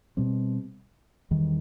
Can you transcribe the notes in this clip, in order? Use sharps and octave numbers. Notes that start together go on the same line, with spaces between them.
B2 G3 C4
E2 D#3 G3